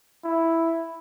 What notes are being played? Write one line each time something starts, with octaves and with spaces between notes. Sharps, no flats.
E4